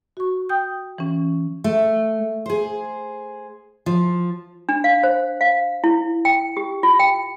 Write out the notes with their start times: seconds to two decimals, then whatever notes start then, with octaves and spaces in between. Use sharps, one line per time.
0.17 F#4 C#6
0.49 G5 D#6 G6
0.98 E3 C#4
1.64 A3
2.46 G#4 C5
3.86 F3
4.69 D4
4.84 F5
5.03 C5
5.41 F5
5.84 E4
6.25 G5
6.57 G4
6.83 F4
7.00 G5